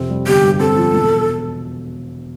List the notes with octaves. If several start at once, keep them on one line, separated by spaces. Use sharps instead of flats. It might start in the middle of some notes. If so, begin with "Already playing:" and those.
Already playing: F2 C3 C4
G3
G1 G4
G2
C4 A4
F3
E1